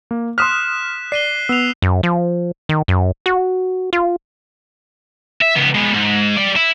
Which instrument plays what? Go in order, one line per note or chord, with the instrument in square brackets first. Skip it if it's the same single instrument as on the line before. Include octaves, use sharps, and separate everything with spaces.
[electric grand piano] A#3
[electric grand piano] C6 D#6 F6 [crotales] F#6 B6 E7
[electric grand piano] D5 [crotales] C7 D#7 G7
[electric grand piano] B3 [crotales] E6 C7 F7
[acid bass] F#2
F3
D#3
F#2
F#4
F4
[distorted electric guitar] E5
C#2 B3
G#3 B3
G#2
G3 D5
E4